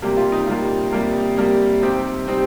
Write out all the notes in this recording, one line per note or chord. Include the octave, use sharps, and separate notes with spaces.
C3 G3 A#3 G4
F4
D#4
C3 G3 A#3 F4
C3 G3 A#3
C3 G3 A#3
C3 G3 C4 D#4 G4
C3 G3 C4 D#4